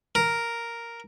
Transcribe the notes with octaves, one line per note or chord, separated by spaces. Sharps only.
A#4